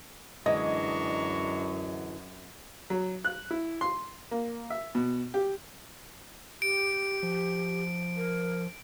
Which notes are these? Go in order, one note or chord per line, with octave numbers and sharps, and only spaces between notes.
F#2 D3 E3 G#3 D4 D#5 A#5 C#6
F#3
F#6
E4
C6
A#3
E5
B2
G4
G4 D7
F3
A#4